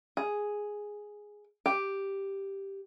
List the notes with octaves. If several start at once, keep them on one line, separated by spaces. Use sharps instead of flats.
G#4
G4